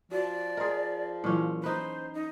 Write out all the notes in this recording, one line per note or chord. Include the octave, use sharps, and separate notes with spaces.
F3 F#4 D5
G#4 A#4 D#5 C6
A#2 E3 F#3 C#4 E4
D#4 B4 C5
D#4